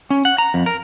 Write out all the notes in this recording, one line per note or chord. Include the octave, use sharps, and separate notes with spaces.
C#4
F#5
A#5
F2
A#4